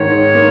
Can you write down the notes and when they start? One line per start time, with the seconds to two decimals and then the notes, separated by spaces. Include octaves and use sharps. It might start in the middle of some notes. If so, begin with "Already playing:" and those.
Already playing: G#2 D#3 C#5
0.35 A#3